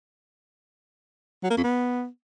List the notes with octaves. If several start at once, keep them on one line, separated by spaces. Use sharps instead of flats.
F#3
A#3
F2
B3